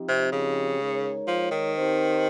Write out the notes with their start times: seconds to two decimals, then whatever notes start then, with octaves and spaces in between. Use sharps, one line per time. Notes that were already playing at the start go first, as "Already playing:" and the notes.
Already playing: F3 C4 D#4 G4
0.08 C3
0.32 C#3
0.80 G#3 D#4 A#4 C#5
1.27 F3
1.51 D#3
1.76 C4 D#4 G4 C5